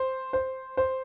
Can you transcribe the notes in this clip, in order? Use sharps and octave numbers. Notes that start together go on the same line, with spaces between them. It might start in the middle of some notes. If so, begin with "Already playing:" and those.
Already playing: C5
C5
C5